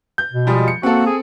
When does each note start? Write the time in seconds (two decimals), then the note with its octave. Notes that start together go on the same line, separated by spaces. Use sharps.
0.18 G6
0.32 B2
0.47 F3 G3 G#3
0.68 C#7
0.83 A#3 C4 F#4 A4
1.07 G#4